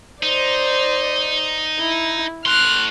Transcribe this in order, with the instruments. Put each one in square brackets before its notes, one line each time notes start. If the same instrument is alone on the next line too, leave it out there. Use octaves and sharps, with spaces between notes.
[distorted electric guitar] D#4 [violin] C5 D5
[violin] E4
[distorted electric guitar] A2 C6 [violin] F6 F#6